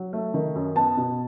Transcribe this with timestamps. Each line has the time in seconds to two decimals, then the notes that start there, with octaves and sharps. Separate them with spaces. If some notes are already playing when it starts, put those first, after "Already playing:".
Already playing: F#3
0.13 A3
0.34 D#3
0.55 F#2
0.76 B3 A5
0.97 B2